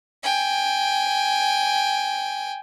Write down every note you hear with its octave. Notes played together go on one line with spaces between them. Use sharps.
G5 G#5